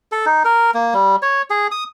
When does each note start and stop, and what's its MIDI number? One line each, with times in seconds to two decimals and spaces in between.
0.12 0.25 69
0.26 0.43 63
0.45 0.71 70
0.74 0.94 58
0.94 1.16 55
1.22 1.42 73
1.50 1.67 68
1.71 1.84 87